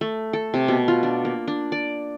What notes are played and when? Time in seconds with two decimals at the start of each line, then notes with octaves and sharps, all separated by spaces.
0.01 A3
0.33 A4
0.54 C3
0.68 B2
0.88 F4
1.03 D4
1.25 A#3
1.48 D4
1.72 D5